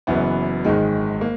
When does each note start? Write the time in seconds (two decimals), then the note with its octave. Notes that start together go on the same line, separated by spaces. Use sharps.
0.07 F#1 F#2 E3 B3
0.65 G#1 G#2 D#3 G#3
1.21 A#3